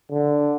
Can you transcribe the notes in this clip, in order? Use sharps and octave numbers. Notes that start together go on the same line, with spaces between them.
D3